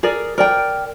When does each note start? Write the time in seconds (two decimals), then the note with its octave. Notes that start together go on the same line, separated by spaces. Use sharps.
0.03 G#4 A#4 D5
0.38 A#4 D5 G5